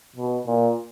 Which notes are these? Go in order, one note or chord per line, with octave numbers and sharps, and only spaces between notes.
B2
A#2